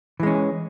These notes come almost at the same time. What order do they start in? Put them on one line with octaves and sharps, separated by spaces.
E3 G#3 C#4